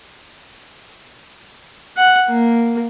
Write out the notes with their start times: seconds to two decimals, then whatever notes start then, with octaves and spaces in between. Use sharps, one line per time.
1.97 F#5
2.30 A#3